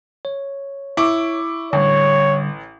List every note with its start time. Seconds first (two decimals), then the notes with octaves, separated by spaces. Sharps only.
0.25 C#5
0.97 E4 C#6 D6
1.73 A1 D3 G3 C#5